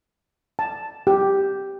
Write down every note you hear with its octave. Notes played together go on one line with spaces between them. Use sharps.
A5
G4